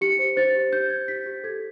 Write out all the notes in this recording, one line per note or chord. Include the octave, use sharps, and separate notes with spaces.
G4 C#7
C5
C5 A6
G4
G4 G6
C5 G#6
G4 B6
G4
A4 G#6